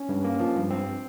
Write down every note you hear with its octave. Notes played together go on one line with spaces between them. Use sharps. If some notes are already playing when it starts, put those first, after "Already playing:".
Already playing: C#4
G2
A#3
F3
G2
G2 C4